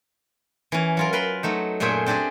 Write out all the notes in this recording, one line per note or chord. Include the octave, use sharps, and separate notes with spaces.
E3 C#4
F#3 F4 A#4
A#4 B4 B5 C6
F#3 A3 D#4
F#2 A#2 A3 G#4 C5 E5
C4 D4 G4 G#4 D5